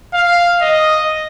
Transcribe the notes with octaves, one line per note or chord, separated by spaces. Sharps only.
F5
D#5